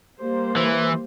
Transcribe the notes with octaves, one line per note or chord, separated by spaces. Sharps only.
G3 A#3 C5
E3